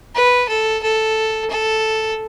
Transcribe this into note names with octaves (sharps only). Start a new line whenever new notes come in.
B4
A4
A4
A4